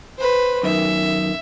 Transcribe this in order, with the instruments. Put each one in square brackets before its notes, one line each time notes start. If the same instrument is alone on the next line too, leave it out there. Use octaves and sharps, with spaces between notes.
[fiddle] B4 C5
[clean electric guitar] F#2 D#3 [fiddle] E5